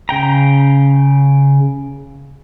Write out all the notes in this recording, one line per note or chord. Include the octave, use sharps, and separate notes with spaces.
C#3 G5 A#5